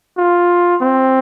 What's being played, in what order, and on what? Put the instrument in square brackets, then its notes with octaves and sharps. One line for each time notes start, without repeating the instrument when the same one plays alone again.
[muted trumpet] F4
C4